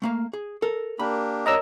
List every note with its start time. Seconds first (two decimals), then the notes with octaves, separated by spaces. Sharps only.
0.02 A3 A#3 F5
0.33 G#4
0.62 A4 A#4
0.99 A#3 D4 G4 B5
1.46 A#4 C#5 D#5 A#5 E6